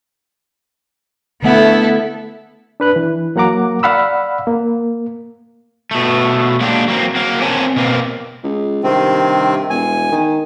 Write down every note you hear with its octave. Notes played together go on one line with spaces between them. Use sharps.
D3 A3 B3 E4 A4 F#5
D4 B4 F#6
E3
F#3 A#3 F#5 A#5 D6
D5 F5 F#5 B5 E6
A#3
B2 A3
F#3 G#3 A#3 D4 G4
F#3 A#3 C4
F#3 A#3
C4 A#4 C#5 F#5 G#5 A5
B2 A#3 C4
C#2
G2 C3 D#3 C4
E1 G#5
D#3